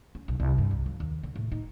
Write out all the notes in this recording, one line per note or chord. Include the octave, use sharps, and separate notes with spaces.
C#4
B1
C2
G2
C2
F3
D#2
D3
A2
D#4